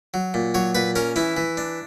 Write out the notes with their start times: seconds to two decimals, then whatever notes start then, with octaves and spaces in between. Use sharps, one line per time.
0.14 F#3
0.34 A#2
0.54 F#3 C#5
0.75 A#2 B4
0.96 C#4 A#4
1.16 E3 E4
1.37 E3
1.57 D4